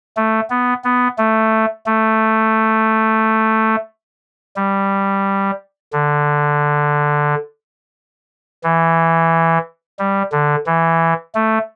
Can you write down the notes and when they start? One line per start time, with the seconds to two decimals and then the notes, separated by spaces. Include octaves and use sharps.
0.17 A3
0.50 B3
0.84 B3
1.18 A3
1.86 A3
4.56 G3
5.93 D3
8.64 E3
9.99 G3
10.32 D3
10.66 E3
11.35 A3